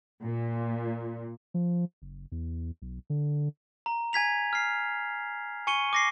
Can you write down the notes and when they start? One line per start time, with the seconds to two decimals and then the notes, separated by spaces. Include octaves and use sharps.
0.24 A#2
1.54 F3
2.02 F#1
2.32 E2
2.82 B1
3.10 D3
3.86 A#5
4.13 G#5 G#6 B6 F7
4.53 F6 C7
5.67 G#5 C#6 C#7 D#7 G7
5.93 D6 A#6 C7